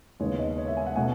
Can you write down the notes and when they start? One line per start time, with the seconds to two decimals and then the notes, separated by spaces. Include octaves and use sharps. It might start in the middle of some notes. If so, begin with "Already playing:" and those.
0.20 D#2 C#3 G#3 B3 C#5
0.39 D#5
0.58 C#5
0.68 E5
0.77 G#5
0.86 F#5
0.96 B2 A3 G#5